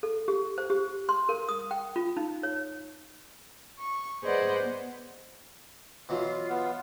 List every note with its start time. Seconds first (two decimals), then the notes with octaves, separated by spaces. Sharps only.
0.03 A4
0.28 G4
0.58 C5
0.70 G4
1.09 C6
1.29 A#4
1.49 D#6
1.71 G5
1.96 F4
2.17 D#4
2.43 C#5
3.80 C#6
4.23 G#4 B4 C5 D5 D#5 F#5
4.63 B3
6.09 B2 E3 F#3 F4
6.50 B3